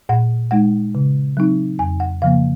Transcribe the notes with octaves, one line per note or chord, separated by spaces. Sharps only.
A#2 F#5
G#3 D#4 F#5
C#3
F#3 C4 D#4
F2 G#5
F#5
C#3 F3 A#3 F5